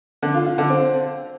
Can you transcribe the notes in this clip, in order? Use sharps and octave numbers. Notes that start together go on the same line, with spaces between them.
D3
F4
F4
D3
C4